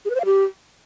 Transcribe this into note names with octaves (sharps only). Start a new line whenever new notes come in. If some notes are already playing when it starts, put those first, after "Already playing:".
G#4
B4
C5
F5
G4